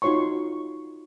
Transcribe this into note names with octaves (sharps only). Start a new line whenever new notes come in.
D#4 F4 F#4 C#5 C6 C#6